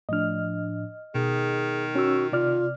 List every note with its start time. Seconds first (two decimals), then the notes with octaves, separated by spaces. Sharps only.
0.09 A2 F3 D4 D#5 F6
1.15 B2 D#3 G#4
1.95 C#4 F#4 E6
2.32 C3 F4 D5 F6